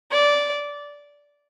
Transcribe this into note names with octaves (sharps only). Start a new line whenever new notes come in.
D5